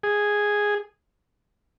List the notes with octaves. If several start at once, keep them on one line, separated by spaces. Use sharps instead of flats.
G#4